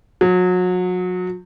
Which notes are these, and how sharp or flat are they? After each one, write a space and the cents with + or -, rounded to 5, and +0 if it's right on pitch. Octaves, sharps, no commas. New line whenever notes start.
F#3 -30